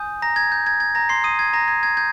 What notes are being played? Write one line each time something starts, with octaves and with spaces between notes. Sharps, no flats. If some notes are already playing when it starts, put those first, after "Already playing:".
Already playing: G#5 D#6 G6
A#5 A#6
G#6
G6
G#6
G#6
A#5 A#6
C6 C7
D#6 D#7
G#6
A#5 A#6
G#6
G#6
G6 G#6